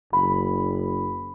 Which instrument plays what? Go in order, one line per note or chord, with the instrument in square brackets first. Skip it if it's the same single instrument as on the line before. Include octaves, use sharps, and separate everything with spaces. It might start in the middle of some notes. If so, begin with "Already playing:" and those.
[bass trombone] F#1 [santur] B5